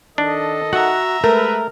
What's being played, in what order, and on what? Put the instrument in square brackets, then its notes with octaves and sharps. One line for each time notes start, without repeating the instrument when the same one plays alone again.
[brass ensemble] D#3 A4 D#5 [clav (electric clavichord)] D4
[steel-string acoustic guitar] F#4 [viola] E5 A#5 [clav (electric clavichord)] F#5
[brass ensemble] G#3 B4 [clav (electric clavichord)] A3 [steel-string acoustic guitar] A#4